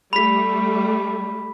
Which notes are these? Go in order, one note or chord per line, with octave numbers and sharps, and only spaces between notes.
G3 A3 B5 B6